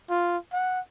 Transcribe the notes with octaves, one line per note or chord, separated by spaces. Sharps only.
F4
F#5